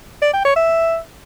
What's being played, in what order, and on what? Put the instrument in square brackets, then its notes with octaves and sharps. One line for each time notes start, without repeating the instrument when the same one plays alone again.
[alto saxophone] D5
G5
C#5
E5